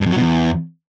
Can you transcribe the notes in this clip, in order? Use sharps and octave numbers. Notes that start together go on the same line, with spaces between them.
G2
F2
F#3
B2
E2